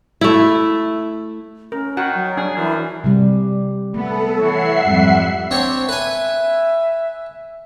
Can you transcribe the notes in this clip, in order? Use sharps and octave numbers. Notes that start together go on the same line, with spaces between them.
A3 E4
C#4 A#4
D#3 F#4 F#5
F#3
D4 G#4
F#2 E3
C3 G3
A3 B3 A4
E3 C#5 E5 F#5 C7
F2 G#2 G3
C4 D4 C#5
B4 E5 G#5